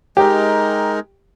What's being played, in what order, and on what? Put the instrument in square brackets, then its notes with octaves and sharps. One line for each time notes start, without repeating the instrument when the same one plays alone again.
[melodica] G#3 D#4 A#4 [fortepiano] G4